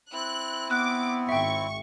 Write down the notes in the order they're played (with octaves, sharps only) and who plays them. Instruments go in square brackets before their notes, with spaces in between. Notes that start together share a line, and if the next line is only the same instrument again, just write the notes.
[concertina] C4 E4 [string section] F#6
[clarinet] B3 [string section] D6 [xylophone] F#6
[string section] G#1 C#6 [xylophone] E5 G5